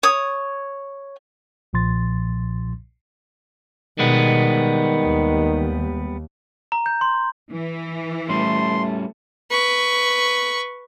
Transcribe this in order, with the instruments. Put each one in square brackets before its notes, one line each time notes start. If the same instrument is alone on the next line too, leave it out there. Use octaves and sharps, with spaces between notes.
[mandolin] C#5 D#6
[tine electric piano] B1 A#2 F3 C6 A6
[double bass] B2 [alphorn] D#3 [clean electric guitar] G3 G#3 B3
[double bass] D#2
[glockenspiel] A#5
G6
C6
[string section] E3
[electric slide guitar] G3 C#4 [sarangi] A3 [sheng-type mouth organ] C6
[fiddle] B4 C#6